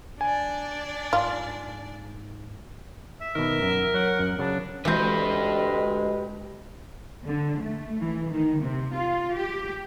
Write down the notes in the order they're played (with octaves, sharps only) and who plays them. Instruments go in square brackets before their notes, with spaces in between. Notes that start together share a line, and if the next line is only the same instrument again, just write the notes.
[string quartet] D4 D5 [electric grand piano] G#5
[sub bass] G#2 [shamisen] F4
[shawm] E5
[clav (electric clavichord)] B2 D#3 [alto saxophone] A#4
[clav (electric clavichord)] F#2
[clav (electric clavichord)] F#3 [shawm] F#5
[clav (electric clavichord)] F#2
[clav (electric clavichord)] C#3 F#3 A5 [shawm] D4
[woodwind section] D2 G#3 [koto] E3 C4 [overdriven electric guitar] G4 B4
[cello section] D3
A3
E3
D#3
C3
F4
G4